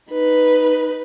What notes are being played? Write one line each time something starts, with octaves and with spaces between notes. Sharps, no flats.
D#4 B4